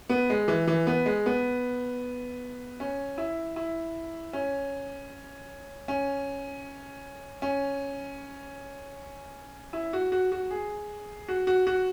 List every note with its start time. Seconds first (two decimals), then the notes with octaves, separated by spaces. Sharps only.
0.10 B3
0.30 G#3
0.48 E3
0.67 E3
0.87 B3
1.06 G#3
1.26 B3
2.80 C#4
3.18 E4
3.56 E4
4.33 C#4
5.88 C#4
7.42 C#4
9.73 E4
9.93 F#4
10.12 F#4
10.32 F#4
10.51 G#4
11.28 F#4
11.47 F#4
11.67 F#4